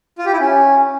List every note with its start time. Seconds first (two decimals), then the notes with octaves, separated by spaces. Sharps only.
0.18 F4
0.25 G4
0.33 E4
0.40 C#4